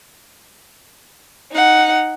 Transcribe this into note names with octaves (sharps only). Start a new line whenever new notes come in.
D#4 F#5